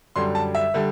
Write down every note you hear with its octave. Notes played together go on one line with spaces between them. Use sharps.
F#2 D3 G3 C6
A5
E5
D3 G3